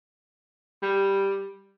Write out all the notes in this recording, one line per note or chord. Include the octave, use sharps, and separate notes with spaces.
G3